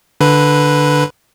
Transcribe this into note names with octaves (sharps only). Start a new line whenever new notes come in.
D3 B4